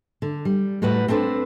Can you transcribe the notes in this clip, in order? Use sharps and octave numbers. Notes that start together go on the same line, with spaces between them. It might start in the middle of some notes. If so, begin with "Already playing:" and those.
D3
G3
A2 G3 F#4 B4 F#5
C4 D4 A4 B4 C5